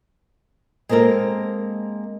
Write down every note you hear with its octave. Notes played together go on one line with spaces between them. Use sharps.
G#3 A#3 C4 A4 A#4